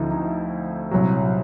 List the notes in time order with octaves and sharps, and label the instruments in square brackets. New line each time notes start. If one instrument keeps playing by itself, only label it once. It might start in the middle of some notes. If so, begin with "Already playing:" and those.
Already playing: [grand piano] D2 D3 F3 C4 D#4 E4
D#4
C2 A#2 F#3